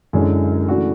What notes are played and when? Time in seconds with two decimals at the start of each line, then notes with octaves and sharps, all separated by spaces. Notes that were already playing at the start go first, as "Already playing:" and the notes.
0.13 F#2 D3 G#3 C#4 E4
0.68 C#3 E3 A3 D4 F#4